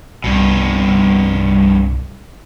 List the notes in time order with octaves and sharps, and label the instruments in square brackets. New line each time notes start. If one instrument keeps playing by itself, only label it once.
[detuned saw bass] C2 [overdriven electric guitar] G2 B2